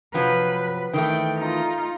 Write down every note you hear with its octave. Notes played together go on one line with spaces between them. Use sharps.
C3 F3 F#3 B4
D#3 E3 A3 G5
D#4 F4